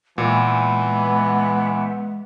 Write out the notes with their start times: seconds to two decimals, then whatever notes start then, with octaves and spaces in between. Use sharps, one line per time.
0.18 A#2 E3 G#3 B3